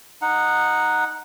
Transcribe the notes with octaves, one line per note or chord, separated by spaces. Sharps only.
D#4 F#5